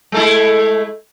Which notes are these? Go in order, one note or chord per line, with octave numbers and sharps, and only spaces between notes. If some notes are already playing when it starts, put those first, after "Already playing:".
G#3 A3 E4